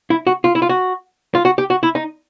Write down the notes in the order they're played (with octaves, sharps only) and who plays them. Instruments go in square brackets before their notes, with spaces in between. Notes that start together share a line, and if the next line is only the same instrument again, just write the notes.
[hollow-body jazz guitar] E4
F#4
F4
E4
F4
F#4
F4
F#4
G4
F#4
E4
D#4